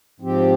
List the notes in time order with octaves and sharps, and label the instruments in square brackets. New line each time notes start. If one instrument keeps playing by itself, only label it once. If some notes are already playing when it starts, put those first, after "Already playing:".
[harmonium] G#2 F3 C4 G4